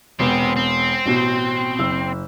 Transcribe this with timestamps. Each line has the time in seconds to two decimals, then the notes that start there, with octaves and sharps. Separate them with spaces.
0.19 E1 B3 C4 G4
0.56 C4
1.06 A1 B2
1.79 F#1 E6